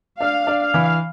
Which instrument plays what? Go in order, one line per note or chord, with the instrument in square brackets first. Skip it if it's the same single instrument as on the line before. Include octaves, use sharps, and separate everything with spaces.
[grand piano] D4 [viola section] F5
[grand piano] D4
[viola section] F5
[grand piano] E3